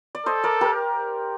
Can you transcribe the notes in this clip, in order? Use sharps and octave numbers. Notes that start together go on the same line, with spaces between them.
D5
A4 C5 D#5
A#4 D5
G4 A#4